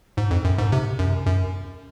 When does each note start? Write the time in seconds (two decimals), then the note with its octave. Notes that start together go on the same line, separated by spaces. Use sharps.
0.17 G#2
0.31 F2
0.44 F#2
0.58 G#2
0.72 C3
0.99 F#2
1.26 F#2